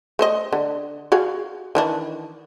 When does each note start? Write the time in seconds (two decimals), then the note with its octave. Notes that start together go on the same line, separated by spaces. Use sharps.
0.19 A3 C5 D#5
0.53 D3
1.12 F#4 G#4 F5
1.75 D#3 E3 D4